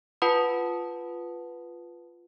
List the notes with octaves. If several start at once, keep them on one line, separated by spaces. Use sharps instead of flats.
F4 B4 F#5 A5 B5 D#6